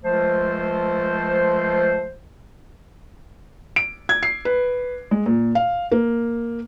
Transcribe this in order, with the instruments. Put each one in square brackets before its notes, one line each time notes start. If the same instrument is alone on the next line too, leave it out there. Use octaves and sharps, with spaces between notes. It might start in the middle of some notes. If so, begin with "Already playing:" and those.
[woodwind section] C#2 F3 A3 C5
[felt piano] D7
G#6
C7
B4
G#3
A#2
F5
A#3